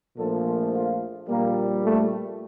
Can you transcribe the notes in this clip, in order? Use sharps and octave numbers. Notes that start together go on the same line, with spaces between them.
A#1 A#2 F3 A3 A4
F4
A#1 A#2 G3 A#3
A3